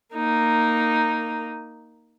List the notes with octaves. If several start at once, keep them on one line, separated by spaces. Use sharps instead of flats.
A#3 D#4